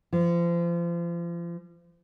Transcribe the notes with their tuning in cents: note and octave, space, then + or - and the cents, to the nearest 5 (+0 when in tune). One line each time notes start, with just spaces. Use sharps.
F3 -35